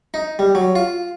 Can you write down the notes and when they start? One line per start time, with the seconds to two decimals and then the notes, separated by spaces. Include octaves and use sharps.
0.14 D#4
0.39 G3
0.55 F#3
0.75 F4